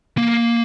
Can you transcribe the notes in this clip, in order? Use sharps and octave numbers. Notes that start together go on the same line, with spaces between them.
A#3